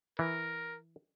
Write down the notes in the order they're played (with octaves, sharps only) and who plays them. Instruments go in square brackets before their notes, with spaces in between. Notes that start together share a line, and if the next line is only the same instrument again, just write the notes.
[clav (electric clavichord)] E3 [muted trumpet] A#4